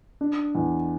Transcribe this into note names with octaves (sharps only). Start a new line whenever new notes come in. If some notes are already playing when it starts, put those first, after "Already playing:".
D4
E2